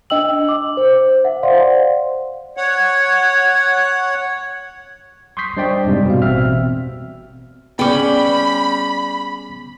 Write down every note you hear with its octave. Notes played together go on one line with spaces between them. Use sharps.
D4 D#5 G5 E6 F#7
D6
C5
E5 F#5
C5 D5 F5 F#5 C6
C#5 F#5
C6 C#6 D#6 G6 B6 C7
G3 D4 C5 D5 D#5 G5
F2 G#2 C3 G3
B2 F5
A1 B2 C4 E5 F6
G3 B3 C#4 G#4 D5 G5 B5 D6